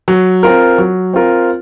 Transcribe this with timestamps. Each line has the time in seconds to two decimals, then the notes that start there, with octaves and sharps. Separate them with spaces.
0.08 F#3
0.43 C4 F4 A#4
0.78 F#3
1.14 C4 F4 A#4